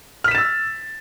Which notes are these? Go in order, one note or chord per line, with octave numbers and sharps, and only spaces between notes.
E6 F6 A6 B6 E7